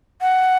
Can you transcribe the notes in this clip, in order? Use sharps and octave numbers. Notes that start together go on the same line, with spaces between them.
F#5